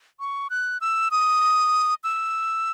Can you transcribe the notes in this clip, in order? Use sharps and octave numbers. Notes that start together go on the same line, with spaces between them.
C#6
F#6
E6
D#6
E6